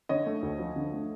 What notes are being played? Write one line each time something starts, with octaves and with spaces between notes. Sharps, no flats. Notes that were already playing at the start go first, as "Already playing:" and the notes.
D3 C#5 D#5
A3
D2
F3
D3
A3